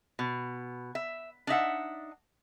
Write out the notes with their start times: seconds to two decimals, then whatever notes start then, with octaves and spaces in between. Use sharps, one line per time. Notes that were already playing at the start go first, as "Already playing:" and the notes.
0.19 B2
0.95 E5
1.47 D4 D#4 E5 F#5